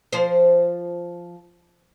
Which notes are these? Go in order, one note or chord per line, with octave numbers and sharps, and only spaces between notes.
F3 C5